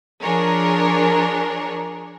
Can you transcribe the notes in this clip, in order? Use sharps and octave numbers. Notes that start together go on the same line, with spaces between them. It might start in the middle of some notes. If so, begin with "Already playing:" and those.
F3 D4 G#4 A#4 C#5